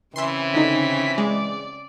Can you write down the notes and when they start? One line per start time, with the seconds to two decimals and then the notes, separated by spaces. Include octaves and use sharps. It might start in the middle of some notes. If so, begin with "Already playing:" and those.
0.16 C#3 E3 C4 E5 C6
0.54 D3 D#4 B6
1.18 G#3 D5